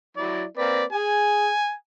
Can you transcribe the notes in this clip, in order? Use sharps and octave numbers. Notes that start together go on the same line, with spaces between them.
F#3 E4 D5
A#3 C4 B4 D5
G#4 G#5